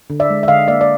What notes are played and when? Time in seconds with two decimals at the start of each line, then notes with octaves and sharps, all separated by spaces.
0.10 D3
0.20 D5 E5
0.30 G#3
0.43 E5
0.48 D3 D#5 F5
0.68 A#3 D5 E5
0.81 D5